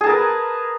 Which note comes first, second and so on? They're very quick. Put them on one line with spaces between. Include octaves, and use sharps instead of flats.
G#4 A5 A#4 B4